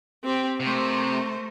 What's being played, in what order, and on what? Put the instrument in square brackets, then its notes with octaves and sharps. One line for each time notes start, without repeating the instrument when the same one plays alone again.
[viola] C4 G4
[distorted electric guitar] C3 [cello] A3 A#4 [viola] C5